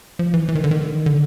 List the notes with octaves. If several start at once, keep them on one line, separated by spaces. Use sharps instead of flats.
F3
E3
E3
D#3
D3
D#3
D3